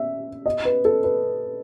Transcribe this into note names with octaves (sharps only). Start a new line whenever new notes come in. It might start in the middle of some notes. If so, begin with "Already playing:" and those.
Already playing: E5
D#5
B4
A4
B4